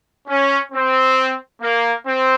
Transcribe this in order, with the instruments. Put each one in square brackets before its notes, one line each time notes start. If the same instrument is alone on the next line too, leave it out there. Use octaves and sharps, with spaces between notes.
[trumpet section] C#4
C4
A#3
C4